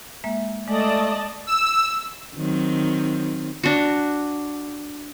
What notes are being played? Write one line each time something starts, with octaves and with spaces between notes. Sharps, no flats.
G#3 A#3 E5
G#3 A3 D5 D#5 A5
E6
D#3 F#3 C4
D4 F#4